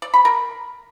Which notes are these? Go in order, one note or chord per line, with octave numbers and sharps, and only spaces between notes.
D5
B5
A#4